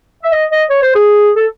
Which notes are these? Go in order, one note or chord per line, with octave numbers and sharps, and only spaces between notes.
E5
D#5
D#5
C#5
C5
G#4
A4